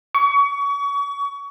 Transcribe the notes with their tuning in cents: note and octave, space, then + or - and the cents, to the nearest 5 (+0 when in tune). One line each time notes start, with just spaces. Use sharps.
C#6 +30